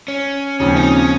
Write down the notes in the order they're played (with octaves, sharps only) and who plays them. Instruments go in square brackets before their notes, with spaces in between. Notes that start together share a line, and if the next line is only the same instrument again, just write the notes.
[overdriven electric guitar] C#4
[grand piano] D#2 C#3 F3 C4 [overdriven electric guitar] C#4
[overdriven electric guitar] D#4
C#4